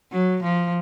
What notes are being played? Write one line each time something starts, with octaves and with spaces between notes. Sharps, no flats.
F#3
F3